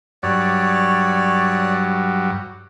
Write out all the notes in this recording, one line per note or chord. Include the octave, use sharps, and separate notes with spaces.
G2 F#3 C#5 D5